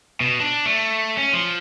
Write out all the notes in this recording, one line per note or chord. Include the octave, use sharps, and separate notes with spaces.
B2
D4
A3
C#4
F3